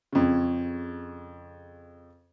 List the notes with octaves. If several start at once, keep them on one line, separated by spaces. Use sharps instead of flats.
F2 C#3